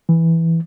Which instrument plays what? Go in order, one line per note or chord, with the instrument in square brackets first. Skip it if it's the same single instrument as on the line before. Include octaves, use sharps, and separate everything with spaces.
[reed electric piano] E3